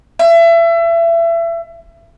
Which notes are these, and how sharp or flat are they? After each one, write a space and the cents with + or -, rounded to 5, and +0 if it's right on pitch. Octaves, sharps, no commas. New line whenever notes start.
E5 +30